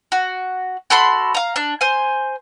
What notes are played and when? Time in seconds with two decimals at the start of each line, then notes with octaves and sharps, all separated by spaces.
0.12 F#4
0.90 F#4 A4 B5 C6
1.34 F5 A#5
1.56 D4
1.81 C5 G#5